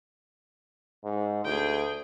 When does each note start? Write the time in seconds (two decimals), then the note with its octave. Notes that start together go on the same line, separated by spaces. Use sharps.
1.04 G#2
1.45 D2 G#4 G5